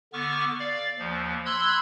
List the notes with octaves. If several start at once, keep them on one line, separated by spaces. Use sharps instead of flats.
D3 B3 C#6 D6 F6
D5 F5
D#2 F3
B5 C6 E6 F#6 G#6